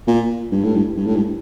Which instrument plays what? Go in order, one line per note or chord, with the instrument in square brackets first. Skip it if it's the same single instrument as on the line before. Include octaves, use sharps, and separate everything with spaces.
[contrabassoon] A#2
G2
A2
G2
G2
A2
G2